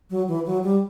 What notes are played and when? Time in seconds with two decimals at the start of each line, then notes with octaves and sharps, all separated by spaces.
0.10 F#3
0.28 E3
0.46 F#3
0.63 G3